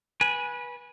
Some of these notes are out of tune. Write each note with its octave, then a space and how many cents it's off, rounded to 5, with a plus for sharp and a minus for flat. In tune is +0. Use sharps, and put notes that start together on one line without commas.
B4 -20 G#5 +0